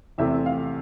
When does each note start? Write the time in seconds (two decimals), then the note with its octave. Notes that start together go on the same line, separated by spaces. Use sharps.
0.18 E2 C3 E3 A3 C4 E5
0.46 F5